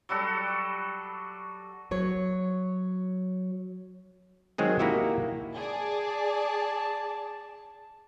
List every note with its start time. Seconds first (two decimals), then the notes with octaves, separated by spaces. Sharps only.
0.09 F#3 G3 F#4 A4
1.91 F#3 C#5
4.58 D#3 F#3 G#3 C4 G#4
4.79 A#3 D#4 E4 F#4 G4 E5
5.55 G#4 D5 A5